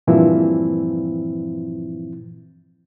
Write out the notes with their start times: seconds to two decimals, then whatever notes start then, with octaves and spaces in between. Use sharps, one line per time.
0.07 G2 A#2 E3 F3 C4 E4